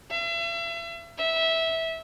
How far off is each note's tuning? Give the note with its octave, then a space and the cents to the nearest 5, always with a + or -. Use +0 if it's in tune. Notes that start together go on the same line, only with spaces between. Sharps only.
E5 +40
E5 -15